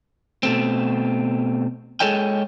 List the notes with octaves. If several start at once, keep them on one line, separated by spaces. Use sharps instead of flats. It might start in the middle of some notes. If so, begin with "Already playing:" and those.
B2 A3 C4
G#3 G#4 A4 C#5 D#5 G5